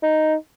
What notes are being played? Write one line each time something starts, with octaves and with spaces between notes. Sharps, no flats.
D#4